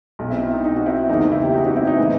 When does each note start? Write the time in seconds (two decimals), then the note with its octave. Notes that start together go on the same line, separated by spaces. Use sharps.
0.19 B1
0.25 B2
0.30 C4 E4
0.42 C4
0.54 D#4
0.64 D#4
0.76 F#4
0.86 C4 E4
1.09 F#1 E2 D#3 D#4
1.31 C4 E4
1.43 G4
1.54 D#4 F#4
1.65 D#4 F#4
1.76 C4 E4
1.87 D#4
1.98 A2 E3